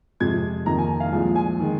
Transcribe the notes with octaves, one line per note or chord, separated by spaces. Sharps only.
F2 C3 G#3 G#6
F2 D#3 A#3 D#4 A#5
G#5
G#5
F5
C2 A#2 F3 G#3 C4 G#5
G#5
D#3 G#3